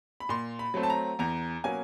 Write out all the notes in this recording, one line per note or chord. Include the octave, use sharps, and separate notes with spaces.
B5
A#2 C6
B5
F#3 A3 C4
A5
A#5
E2 A#5
B2 F#3 A#3 C#4 G#5